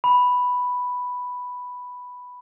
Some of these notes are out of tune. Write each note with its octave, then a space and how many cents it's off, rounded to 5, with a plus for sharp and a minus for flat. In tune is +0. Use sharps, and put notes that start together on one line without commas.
B5 +0